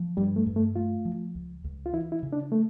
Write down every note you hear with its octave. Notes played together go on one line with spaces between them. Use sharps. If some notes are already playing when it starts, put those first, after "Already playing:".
Already playing: F3
G2 G3
A3
G2
A3
A3 F4
F3
C#2
C#2
F4
E3 E4
E4
C#3
D4
A3